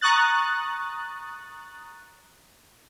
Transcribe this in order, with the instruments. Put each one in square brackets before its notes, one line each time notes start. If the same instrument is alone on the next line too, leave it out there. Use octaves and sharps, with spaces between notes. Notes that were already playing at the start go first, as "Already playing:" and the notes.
[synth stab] A#5 C#6 D#6 F#6 A6